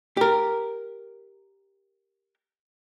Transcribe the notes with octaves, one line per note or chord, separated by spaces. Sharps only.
G4 A#4